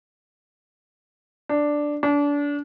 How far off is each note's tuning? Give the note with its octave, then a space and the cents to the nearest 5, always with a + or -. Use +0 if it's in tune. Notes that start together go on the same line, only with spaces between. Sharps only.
D4 +0
D4 -30